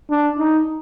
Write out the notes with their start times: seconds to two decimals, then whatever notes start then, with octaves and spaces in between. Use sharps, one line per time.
0.10 D4
0.39 D#4